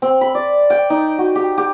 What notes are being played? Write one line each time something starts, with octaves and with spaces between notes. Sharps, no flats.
C4
B5
D5
G5
D#4
F#4
G4
G4